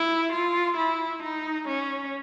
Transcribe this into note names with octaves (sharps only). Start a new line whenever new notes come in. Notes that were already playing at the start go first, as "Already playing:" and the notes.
Already playing: E4
F4
E4
D#4
C#4